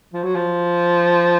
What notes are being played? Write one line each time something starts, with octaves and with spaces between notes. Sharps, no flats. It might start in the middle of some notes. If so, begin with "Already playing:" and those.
F3
F#3
F3